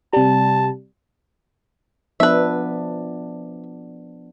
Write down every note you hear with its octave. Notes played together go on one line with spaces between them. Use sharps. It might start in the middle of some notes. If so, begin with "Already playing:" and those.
C3 G3 A5
F3 B3 D4 B4 E5